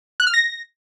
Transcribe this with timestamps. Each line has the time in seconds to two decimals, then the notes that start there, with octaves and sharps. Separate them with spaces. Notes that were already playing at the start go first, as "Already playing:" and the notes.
0.20 F#6
0.27 F6
0.34 A#6